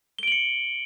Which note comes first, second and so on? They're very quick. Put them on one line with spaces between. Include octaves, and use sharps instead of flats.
G7 D7 F#7 C#7